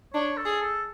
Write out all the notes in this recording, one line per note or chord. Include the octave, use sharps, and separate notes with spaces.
D4 C#5
A4
G#4
A4